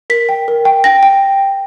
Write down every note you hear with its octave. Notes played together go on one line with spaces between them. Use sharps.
A#4 B6
G5
A#4
G5
G5 A#6
G5